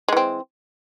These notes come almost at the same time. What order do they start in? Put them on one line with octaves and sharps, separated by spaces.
G#3 E3 C4